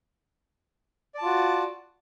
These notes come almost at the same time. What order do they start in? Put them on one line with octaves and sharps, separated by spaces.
D5 A5 F4 F#4